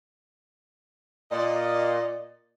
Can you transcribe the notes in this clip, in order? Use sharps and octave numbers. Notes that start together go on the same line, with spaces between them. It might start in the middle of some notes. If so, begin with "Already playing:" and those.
A#2 D5 D#5